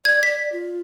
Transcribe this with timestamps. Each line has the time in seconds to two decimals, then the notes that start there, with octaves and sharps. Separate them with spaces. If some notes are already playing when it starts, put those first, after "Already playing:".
0.05 D5 G#6
0.23 D5 B6
0.39 D5
0.52 F4